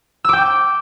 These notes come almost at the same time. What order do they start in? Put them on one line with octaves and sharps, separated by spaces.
E6 D6 G5